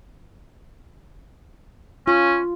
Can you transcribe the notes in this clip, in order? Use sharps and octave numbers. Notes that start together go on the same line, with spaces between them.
C#4 F4